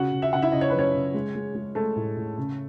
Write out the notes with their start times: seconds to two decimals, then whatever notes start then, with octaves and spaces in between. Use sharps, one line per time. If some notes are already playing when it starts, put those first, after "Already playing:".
Already playing: C#3 F#4 F#5
0.12 C#3
0.22 E5
0.33 C#3 F#5
0.42 E4 E5
0.52 C#3 D#5
0.61 C#5
0.70 B4
0.74 F#3 C#4 C#5
0.94 C#3
1.14 G#3
1.35 G#3
1.55 G#3
1.75 G#3 A3 A4
1.96 A2
2.17 A2
2.38 C#3